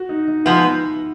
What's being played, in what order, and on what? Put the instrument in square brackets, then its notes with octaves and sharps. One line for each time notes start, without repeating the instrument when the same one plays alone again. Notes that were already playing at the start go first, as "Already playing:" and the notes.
Already playing: [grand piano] F#4
D#4
D#4
[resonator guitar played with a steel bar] F3 G#3 B3 [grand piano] E4